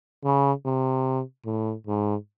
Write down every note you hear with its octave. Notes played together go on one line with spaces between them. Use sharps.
C#3
C3
A2
G#2